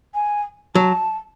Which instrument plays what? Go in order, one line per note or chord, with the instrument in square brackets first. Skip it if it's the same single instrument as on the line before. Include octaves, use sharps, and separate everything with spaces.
[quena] G#5
[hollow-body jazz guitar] F#3 [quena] A5